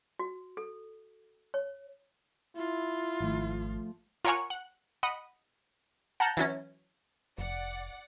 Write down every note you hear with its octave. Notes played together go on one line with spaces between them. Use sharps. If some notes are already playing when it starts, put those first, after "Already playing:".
F#4
A4
C#5
E4 F4
G#1 F3 A3
F4 A#4 C#5 F#5 G#5 C#6
F#5
D#5 F#5 B5
F#5 A5 A#5 F6 G6
E3 F#3 C#4
F1 D5 F#5